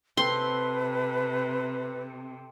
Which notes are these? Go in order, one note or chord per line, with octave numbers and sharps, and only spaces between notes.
C3 C4 A4 B4 C6